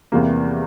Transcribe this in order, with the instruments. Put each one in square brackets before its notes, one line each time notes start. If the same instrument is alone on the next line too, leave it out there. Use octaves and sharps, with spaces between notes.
[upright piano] E2 C3 E3 G3 A#3